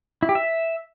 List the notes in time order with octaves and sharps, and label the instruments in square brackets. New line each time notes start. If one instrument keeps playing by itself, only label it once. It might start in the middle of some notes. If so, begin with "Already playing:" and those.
[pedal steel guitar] E4
G4
E5